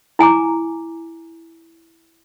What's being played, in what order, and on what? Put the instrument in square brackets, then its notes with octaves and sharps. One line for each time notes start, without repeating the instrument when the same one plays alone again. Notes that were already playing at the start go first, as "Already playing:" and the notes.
[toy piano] E4 G#5 A#5 D6